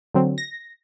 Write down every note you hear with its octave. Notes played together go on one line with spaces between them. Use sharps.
D3 F#3 C4
A#6